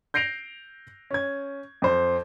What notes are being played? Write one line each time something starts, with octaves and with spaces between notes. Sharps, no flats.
G6 A#6 C7 D7 F7
C#4 G#6
F2 C5